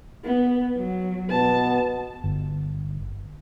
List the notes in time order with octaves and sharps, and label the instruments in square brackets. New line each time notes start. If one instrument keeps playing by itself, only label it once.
[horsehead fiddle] B3
F#3
[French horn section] B2 B3 [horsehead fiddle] A5
[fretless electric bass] G1